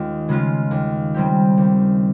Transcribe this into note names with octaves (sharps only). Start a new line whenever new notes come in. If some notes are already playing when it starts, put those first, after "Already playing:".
Already playing: D#2 G#3 C#4 F4
C#3 G#3 C#4 F4
D#2
C#3 G3 C4 G4
D#2